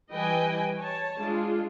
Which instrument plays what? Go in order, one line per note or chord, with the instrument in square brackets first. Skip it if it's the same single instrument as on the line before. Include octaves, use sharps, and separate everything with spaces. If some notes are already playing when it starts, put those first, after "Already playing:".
[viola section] E3 G3 B4 D#5 G5 G#5
C#5 A5
G#3 D4 F4